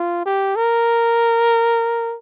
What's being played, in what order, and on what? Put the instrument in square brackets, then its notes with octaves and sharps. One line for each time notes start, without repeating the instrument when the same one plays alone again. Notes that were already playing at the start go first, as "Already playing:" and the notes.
Already playing: [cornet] F4
G4
A#4